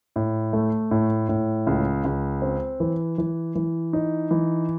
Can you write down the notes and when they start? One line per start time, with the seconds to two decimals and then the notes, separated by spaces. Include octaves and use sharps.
0.16 A2
0.53 A3
0.91 A2
1.29 A2
1.67 C#2
2.04 C#2
2.42 C4
2.80 E3
3.18 E3
3.55 E3
3.93 D#4
4.31 E3